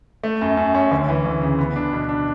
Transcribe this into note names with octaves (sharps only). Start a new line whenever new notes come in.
A3
F#2
F#2
C#4
D2
E3
D2
C#3
B3
D4
B2
D4